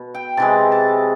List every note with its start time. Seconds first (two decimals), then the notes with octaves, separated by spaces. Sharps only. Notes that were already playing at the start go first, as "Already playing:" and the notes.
Already playing: B2
0.14 G5
0.37 C3 E3 G#3 A5
0.72 A5